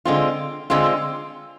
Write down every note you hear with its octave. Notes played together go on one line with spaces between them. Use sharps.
D3 G#3 C4 F4
D3 G#3 C4 F4